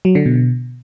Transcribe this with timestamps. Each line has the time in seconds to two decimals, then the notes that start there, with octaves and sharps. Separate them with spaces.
0.05 F#3
0.15 D3
0.26 B2